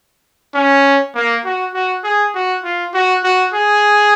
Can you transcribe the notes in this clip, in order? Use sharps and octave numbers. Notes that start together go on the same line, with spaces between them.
C#4
A#3
F#4
F#4
G#4
F#4
F4
F#4
F#4
G#4